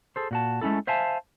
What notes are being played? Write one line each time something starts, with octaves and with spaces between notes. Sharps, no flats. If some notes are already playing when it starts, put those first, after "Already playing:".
G#4 A4 C5
A#2 F#4 A5
G#3 A3 C#4 E4 A4
C5 E5 F5 G#5 A5